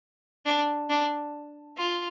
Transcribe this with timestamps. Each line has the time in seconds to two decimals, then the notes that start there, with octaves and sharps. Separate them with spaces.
0.46 D4
0.89 D4
1.77 F4